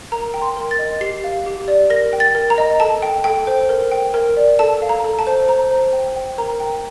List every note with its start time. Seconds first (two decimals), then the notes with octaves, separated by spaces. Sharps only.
0.12 A#4 A#5
0.34 G5
0.42 C6
0.57 A#4
0.71 A6
0.79 D#5
1.01 G4 C7
1.24 F5
1.46 G4
1.68 D5
1.90 A#4 A#6
2.13 G5
2.20 A6
2.35 A#4
2.50 A#5
2.58 D#5
2.80 A4 A5
3.02 G5
3.24 A4 G5
3.47 C5
3.69 A#4
3.92 G5
4.14 A#4
4.37 D5
4.59 A4 A5
4.82 F5
4.89 A#5
5.04 A4
5.19 A5
5.27 C5
5.48 C5 A#5
5.71 C5
5.93 G5
6.16 G5
6.38 A#4 A#5
6.60 G5